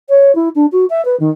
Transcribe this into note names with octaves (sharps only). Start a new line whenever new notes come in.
C#5
E4
D4
F#4
E5
B4
D#3